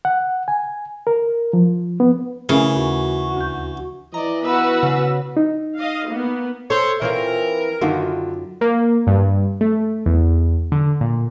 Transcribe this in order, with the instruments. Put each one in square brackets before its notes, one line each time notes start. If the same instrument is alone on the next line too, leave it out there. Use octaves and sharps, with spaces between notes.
[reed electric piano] F#5
G#5
A#4
F3
B3
[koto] C#3 [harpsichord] E3 [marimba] A3 A#4
[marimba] D#2 [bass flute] F#4
[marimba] D2 G6
[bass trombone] E3 [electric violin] D5 D#5 [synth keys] A#5
[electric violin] B3 E6 [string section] F#4 B4
[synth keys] C#3
[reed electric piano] D#4
[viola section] D#5 F5
A#3 B3
[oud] A4 [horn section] C5 C#5
[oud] E3 C4 F4 [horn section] A#4 [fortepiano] C#5
[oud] F#2 F4 F#4 [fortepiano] D3 D#3
[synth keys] A#3
G2
A3
E2
D3
A#2